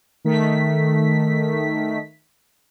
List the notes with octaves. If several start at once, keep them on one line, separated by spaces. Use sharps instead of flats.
D#3 A3 B6